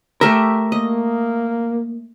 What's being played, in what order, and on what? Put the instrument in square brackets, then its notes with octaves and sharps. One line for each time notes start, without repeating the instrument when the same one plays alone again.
[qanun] A3 G4 E5 [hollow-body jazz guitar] A#4
[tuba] A#3 [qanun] D#5